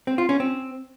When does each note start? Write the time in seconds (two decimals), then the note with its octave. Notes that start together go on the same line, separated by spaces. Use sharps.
0.07 C4
0.18 F4
0.29 C#4
0.40 C4